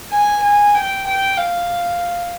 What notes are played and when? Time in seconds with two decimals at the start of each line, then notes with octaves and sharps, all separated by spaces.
0.11 G#5
0.43 G#5
0.75 G5
1.06 G5
1.38 F5